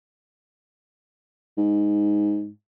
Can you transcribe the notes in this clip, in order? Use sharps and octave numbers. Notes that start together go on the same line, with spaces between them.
G#2